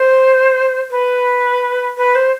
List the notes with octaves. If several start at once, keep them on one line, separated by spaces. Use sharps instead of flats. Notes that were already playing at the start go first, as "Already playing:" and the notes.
Already playing: C5
B4
B4
C5